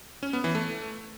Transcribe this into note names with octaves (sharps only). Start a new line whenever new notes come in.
C#4
B3
E3
A3